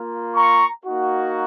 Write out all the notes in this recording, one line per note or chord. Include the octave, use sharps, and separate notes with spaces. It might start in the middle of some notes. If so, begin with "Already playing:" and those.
Already playing: A#3 F4
A#5 C#6
A#3 D#4 F#4